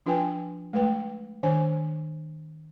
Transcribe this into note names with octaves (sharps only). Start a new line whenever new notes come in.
F3 D4 F4 B4 G5 G#5
G#3 A3 B4 G5
D#3 D4 C5 G#5